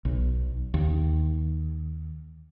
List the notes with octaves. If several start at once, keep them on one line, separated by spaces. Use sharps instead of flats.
B1
D#2